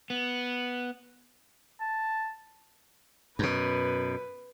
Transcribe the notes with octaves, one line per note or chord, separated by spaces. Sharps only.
B3
A5
F#2 B2 B4